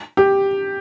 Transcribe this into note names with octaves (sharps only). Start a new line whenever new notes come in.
G4